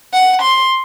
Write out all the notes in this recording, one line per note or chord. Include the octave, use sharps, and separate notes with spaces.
F#5
C6